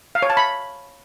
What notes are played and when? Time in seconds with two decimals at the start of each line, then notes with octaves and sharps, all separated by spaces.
0.15 F5
0.22 C#5
0.30 A5
0.37 B5